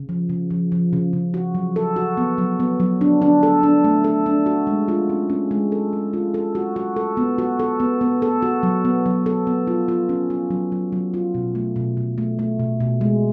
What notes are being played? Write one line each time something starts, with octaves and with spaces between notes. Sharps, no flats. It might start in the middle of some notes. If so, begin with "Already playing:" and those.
Already playing: C#3
F3
C#3
F3
F3
C#3
C#3
F#4
F#3
A4
F#4
B3
F#3
B3
F#3
D4
D4
A4
D4
A3
A4
D4
F#4
G#3
F4
C#4
C#4
G#3
A4
C#4
F4
A4
F#4
F#4
A4
B3
F#4
A4
B3
B3
A4
F#4
F#3
B3
F#3
A4
B3
F4
F4
C#4
F4
F#3
F#3
F#3
F4
B2
A3
B2
B2
A3
A3
B2
B2
G#3